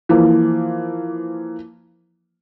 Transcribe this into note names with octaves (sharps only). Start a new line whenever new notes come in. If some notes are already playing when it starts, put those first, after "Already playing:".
E3 F3 A#3